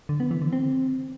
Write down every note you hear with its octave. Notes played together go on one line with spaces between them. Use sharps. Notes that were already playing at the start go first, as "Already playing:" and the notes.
D3
B3
E3
D3
C4